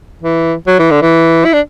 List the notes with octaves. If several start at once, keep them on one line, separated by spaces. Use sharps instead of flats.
E3
F#3
E3
D3
E3
E4
D4